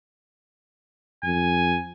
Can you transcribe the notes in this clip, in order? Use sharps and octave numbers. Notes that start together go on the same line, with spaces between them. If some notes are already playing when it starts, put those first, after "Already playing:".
F2 G#5